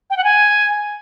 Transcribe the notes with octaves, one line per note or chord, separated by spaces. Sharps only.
G5
F#5
G#5